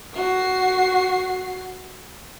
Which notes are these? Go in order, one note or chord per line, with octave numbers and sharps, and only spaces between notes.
F#4 C7